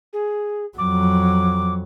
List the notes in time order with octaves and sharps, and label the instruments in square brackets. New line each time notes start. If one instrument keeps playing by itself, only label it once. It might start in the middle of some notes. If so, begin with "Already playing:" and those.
[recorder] G#4
[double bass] F2 F#3 [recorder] D6